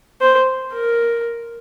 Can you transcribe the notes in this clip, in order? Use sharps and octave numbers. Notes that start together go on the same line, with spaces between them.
C5
A#4